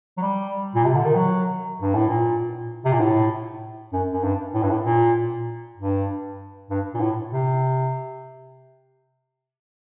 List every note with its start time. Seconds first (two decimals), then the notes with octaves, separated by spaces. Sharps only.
0.18 F#3
0.22 G3
0.75 A#2
0.85 C3
0.95 D3
1.05 D#3
1.15 F#3
1.81 G2
1.95 A2
2.08 A#2
2.85 C3
2.93 A#2
3.00 A2
3.93 F#2
4.13 F#2
4.24 G2
4.54 A2
4.63 G2
4.71 A2
4.85 A#2
5.77 G2
6.70 G2
6.94 A#2
7.00 A2
7.32 C3